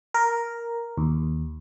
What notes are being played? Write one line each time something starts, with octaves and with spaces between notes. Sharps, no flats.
A#4
D#2